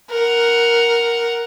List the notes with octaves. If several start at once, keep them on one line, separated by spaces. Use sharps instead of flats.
A#4 F#5